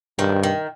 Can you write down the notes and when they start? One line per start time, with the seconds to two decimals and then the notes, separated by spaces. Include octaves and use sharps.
0.19 G2 D#3
0.43 D#3